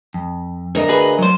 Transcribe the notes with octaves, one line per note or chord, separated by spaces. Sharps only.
F2
D2 A#4 D#5
F#4 G#4 B4
F#3 C5